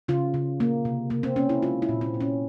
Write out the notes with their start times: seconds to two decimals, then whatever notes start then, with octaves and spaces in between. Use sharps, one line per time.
0.08 C#3 F4
0.34 C#3
0.60 A#3
0.85 C3
1.10 C3 A#3
1.23 C4
1.36 A#3 C#4
1.49 E4
1.63 G#3 F4
1.82 E4
1.89 A#2
2.01 C4
2.14 A#2
2.20 C#4